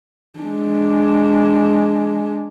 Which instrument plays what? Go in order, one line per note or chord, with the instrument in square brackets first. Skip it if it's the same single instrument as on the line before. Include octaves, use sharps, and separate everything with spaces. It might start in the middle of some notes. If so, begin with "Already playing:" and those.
[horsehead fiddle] G#3 D4